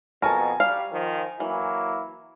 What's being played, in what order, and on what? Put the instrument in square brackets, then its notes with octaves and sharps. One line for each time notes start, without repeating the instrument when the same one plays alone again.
[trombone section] F2 B2 [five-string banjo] A4 A#4 [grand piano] G#5 A#5 C#6
[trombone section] G3 [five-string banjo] F5
[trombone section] D#3 F3
[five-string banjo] E3 [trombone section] F#3 A#3 E4